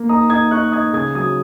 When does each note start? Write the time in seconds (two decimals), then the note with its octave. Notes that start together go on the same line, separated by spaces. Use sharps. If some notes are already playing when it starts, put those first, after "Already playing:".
Already playing: A#3
0.09 D#4 A#5 D#6
0.30 D#4 D#6 G#6
0.51 D#4 C#6 F#6
0.72 D#4 D#6 G#6
0.93 C#3 D#6 G#6
1.15 F#3 D#6 G#6